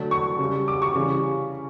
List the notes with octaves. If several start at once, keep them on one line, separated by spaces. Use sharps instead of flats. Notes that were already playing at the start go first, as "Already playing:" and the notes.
Already playing: D3 F#3 A3
C#6
C#3 G3
D6
C#6
C#3 E3 G3